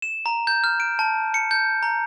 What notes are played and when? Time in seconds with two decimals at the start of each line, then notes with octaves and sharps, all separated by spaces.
0.02 E7
0.26 A#5
0.47 G6
0.64 F6
0.80 D7
0.99 A5
1.34 C#7
1.51 G6
1.83 A#5